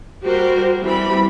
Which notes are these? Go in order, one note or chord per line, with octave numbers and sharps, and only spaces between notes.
G3 F#4 G4 A#4 C5
E3 G3 C4 G4 B5